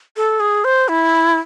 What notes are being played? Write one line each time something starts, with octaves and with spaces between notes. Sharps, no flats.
A4
G#4
C5
E4